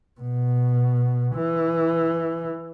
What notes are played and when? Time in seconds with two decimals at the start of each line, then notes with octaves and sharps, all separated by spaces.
0.21 B2
1.35 E3